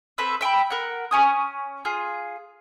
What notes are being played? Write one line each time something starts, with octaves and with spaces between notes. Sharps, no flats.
C4 A4 B4 E5
E5 G5 A5 B5
A#4 F#5
C#4 G#5 D#6
F4 G#4